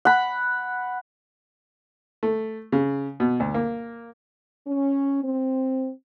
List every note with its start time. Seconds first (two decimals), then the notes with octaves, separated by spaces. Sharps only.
0.05 F#5 B5
2.23 A3
2.72 C#3
3.20 B2
3.40 D2
3.54 A#3
4.67 C#4
5.22 C4